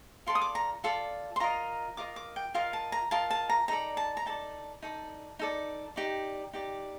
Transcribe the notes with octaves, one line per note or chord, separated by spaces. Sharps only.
F4 A4 D5 C6
D#6
D6
A#5
F4 A4 D5 A5
C6
F4 A#4 D#5 A#5
F4 A#4 D#5 D6
D6
G5
F4 A#4 D#5 F5
A5
A#5
F4 A#4 D#5 A5
A5
A#5
D#4 A4 D5 A#5
A5
A#5
D#4 A4 D5 A5
D#4 A4 D5
D#4 A4 D5
D#4 G4 D5
D#4 G4 D5